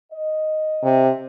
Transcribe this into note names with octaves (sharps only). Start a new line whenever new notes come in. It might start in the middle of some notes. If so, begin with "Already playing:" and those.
D#5
C3